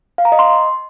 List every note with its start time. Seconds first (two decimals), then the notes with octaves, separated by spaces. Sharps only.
0.18 F5
0.25 A#5
0.32 D#5
0.39 C6